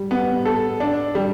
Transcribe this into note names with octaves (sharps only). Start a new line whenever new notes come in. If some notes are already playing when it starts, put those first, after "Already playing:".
Already playing: G3
B3
A4
D4
G3